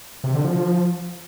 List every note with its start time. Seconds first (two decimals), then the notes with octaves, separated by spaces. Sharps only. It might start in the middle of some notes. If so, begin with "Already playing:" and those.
0.24 C3
0.34 D3
0.44 F3